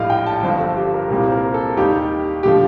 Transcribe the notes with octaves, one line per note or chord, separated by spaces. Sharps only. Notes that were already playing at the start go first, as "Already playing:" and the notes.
Already playing: A#1 A2 G3 D#5 F5
G5
A5
G1 G2 F3 C5
A4
G4
A#4
C2 A#2 G3 A#4
C5
A#4
A4
D#2 D#3 G3 G4
D3 F3 G4